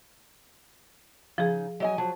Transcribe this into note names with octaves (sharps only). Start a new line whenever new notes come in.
C#3 F3 D#4 G#4
F#3 D#5 G#5
F3 F#3 A5